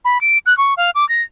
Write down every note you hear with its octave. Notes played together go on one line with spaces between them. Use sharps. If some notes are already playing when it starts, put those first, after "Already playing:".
B5
D7
F#6
C#6
F5
D6
A#6